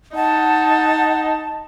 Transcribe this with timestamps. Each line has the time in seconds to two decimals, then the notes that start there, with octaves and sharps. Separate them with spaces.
0.15 D#4 F#5 A5